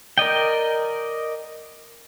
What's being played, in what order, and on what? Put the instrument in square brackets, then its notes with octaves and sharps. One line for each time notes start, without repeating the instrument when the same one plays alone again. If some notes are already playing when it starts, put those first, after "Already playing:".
[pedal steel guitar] A#4 D5 D#5 G5